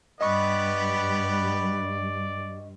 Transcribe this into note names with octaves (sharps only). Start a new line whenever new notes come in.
G2 B3 G4 B4 D5 D#5 C#6